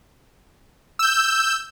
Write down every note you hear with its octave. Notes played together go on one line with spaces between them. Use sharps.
E6 G6